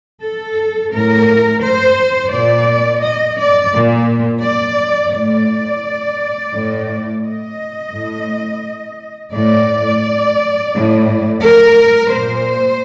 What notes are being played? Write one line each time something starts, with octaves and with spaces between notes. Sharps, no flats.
A4
A2 A#4
C5
A#2 D5
D#5
D5
A#2
D5
A2 D5
A2
D#5
A2
A2 D5
A2
A#4
A#2 C5